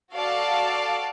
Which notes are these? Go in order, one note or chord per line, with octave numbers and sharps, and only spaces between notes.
F#4 A4 D5 F5 A5